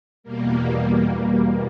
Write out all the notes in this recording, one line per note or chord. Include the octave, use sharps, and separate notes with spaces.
E2 B2 G3 A#3